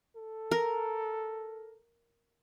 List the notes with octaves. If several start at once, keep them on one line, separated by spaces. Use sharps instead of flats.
A4
A#4